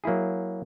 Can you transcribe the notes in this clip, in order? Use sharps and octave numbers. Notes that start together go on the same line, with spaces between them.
F#3 A#3 E4 G#4